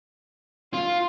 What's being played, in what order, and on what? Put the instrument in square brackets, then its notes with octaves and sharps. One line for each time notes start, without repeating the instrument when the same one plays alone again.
[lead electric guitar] F4 [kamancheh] C6